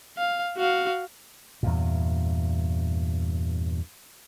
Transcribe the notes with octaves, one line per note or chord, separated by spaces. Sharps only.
F5
F#4 F5
E2 G2 A#2